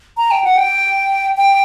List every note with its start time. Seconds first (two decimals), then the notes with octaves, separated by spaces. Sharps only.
0.17 A#5
0.31 G5
0.44 F#5
0.57 G5
1.37 G5